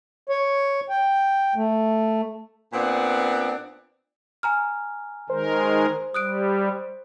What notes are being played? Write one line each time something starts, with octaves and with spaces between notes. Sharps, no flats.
C#5
G5
A3
A#2 B3 C4 D4
G#5 A#5 F6
D#3 G#3 A#4 C5
G3 D#6 F#6 D7